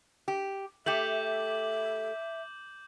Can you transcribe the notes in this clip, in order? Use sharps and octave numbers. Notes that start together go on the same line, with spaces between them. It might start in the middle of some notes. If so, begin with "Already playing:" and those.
G4
A3 G4 E5 D6 G6 F#7